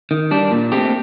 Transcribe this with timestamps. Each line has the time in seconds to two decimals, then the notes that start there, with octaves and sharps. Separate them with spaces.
0.11 D#3
0.31 G3 D4
0.51 A#2
0.72 A3 C4 G4